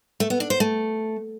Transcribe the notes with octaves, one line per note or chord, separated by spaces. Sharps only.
A3
B3
D4
C5
A3